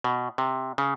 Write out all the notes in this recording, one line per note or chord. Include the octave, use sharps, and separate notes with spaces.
B2
C3
C#3